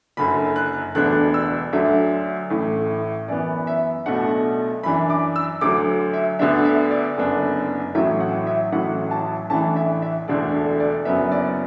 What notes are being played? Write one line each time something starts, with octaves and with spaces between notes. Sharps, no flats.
F#1 F#2 D3 B5
F#6
E1 D2 D3 B3 D4 F#6
E6
D2 D3 F#3 D4 E5
A1 A2 A3
F#2 E3 B3 D5
E5
B1 B2 A3 D4 F#5
F#2 E3 D4 B5
D6
E6
D2 D3 F#3 D6
E5
D2 D3 B3 D4 E5
E5
D5
F#1 F#2 D3 B3 D4
A1 A2 F#3 E5
F#5
E5
A1 A2 F#3 F#5
A5
A1 A2 E3 D4 A5
E5
E5
E1 D2 D3 A3 D4 D5
D5
F#1 F#2 F#3 B3 E5
D5